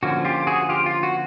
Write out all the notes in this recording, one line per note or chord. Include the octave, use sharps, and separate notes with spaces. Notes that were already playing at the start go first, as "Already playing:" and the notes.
D3 F3 A#3 C#4 F#4
F4 G4
F#4 G#4
F4 G4
F4
F#4